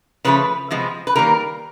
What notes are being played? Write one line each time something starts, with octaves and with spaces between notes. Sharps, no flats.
C#3 F3 A3 B4
C3 F3 G#3 B3
B4
D#3 G3 A#3 A#4